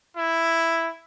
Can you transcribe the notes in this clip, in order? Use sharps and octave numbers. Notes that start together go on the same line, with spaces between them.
E4